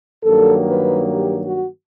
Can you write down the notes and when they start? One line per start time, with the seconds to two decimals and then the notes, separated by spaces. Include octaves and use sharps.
0.24 G2 D#3 F#3 A#3 A4
0.69 B4
1.14 G4
1.45 F#4